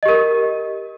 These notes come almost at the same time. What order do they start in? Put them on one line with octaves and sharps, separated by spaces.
D#5 G4 A#4